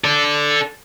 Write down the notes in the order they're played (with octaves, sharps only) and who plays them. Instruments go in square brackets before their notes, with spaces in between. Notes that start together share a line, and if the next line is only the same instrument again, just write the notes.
[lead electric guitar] A4 D5